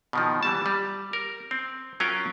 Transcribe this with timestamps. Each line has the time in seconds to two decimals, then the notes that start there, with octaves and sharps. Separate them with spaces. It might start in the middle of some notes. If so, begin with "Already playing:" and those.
0.13 B2 D#3 F3
0.43 E3 G3 A5
0.66 G3
1.13 A#4
1.51 C4
2.00 F#3 C#4 F4 A#4 G5